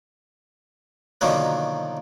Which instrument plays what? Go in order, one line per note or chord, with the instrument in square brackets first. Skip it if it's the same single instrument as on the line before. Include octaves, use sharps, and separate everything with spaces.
[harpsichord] B2 D3 D#3 F3 F#3 A#3